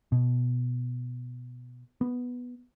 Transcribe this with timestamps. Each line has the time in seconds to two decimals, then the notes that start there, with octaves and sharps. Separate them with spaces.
0.12 B2
2.01 B3